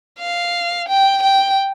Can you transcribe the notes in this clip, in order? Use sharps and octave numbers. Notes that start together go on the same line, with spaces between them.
F5
G5
G5